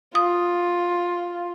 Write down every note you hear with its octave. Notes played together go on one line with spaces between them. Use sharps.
F4 D#6